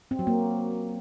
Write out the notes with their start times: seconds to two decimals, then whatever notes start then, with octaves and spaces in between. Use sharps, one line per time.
0.11 C4
0.19 F#3
0.27 A#3